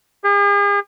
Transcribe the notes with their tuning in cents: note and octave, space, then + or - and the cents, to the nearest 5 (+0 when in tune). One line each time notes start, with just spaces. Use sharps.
G#4 -45